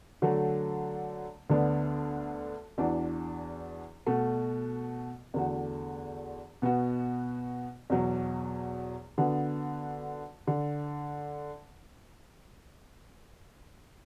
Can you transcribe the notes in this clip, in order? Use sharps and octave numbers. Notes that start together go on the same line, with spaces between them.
D3 F#3 A3
D2 D3 B3 D4
E2 E3 D4 F#4
B2 A3 F#4
E2 D3 A3 F#4
B2 B3 F#4
E2 B2 F#3
D3 B3 D4 F#4
D3